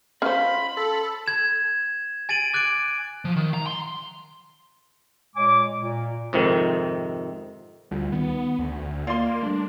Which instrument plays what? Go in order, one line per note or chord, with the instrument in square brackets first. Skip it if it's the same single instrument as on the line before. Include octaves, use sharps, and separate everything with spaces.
[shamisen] C#4 C5 [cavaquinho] F4 C6 [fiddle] B5
[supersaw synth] A4
[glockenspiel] G#6 E7
G#5 A6 D7 D#7 F#7
D6 F#6 G#6 A6 D7
[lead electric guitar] F3
D#3
A#5
C6
[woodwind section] A#2 G#3 C#5 G#5 D6
A#2
[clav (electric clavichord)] F2 G#2 C3 D#3
[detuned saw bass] D2 [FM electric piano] G3 F4
[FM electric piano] D#3 [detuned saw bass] B3
[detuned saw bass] D2
[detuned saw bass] A#3 [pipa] F4 C6 [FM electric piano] D5 D#5
[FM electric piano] G3 A3 [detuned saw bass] D4